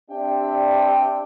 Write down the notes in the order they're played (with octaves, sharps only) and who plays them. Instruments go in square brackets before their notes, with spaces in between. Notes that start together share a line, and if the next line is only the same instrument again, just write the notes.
[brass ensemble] C4 D4 G4 D5 E5 G5